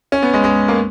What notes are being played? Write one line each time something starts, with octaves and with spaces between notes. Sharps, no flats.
C#4
B3
G#3
G#3
A#3